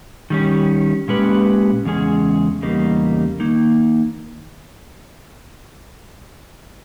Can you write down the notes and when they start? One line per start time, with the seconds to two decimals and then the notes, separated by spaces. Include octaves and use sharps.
0.30 D#3 G3 C#4
1.08 A#2 G#3 C#4 G4 B4
1.85 E2 C#3 G#3 C#4 G#4
2.62 E2 C#3 G3 A#3 D#4
3.40 D#3 A#3 D#4